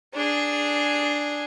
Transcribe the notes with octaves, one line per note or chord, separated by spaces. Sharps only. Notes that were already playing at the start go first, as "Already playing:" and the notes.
D4 G#4